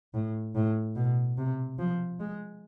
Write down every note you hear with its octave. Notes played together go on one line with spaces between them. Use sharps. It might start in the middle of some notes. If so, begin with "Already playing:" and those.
A2
A2
B2
C3
F3
G#3